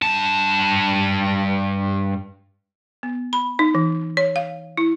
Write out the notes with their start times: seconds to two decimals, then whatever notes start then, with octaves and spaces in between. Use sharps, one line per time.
0.02 G2 A5
3.03 B3
3.33 B5
3.59 D#4
3.75 E3
4.17 C#5
4.36 F5
4.77 E4